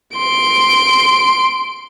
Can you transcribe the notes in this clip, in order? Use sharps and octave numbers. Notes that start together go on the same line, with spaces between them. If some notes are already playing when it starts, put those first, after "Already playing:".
C6 D7